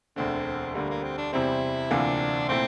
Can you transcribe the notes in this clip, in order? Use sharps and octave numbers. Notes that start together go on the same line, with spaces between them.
E1 D2 D3 C4
D2 D3 G3 A#3
A#3
C4
D4
E2 C3 G3 C4 E4
D2 C3 E3 A#3 D4 F4
A#2 A3 C4 E4